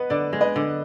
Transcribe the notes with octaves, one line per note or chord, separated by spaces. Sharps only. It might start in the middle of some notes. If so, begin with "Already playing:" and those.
Already playing: B3 B4 D#5
D3 D5
G#3
B4 D#5
D3